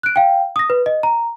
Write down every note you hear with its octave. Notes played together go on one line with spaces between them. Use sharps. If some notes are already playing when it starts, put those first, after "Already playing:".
F#6 D7
F5 G5
D#6 A#6
B4
D#5
A#5